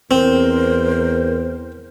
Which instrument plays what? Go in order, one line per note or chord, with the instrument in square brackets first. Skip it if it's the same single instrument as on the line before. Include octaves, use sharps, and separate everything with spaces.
[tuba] E2 [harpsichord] C4 [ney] A#4 [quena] C5